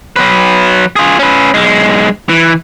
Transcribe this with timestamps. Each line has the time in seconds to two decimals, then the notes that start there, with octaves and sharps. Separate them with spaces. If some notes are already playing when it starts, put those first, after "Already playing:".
0.16 F#3 B4
0.96 F4 G#4
1.19 C#4 B4
1.54 B1 G#3
2.29 E3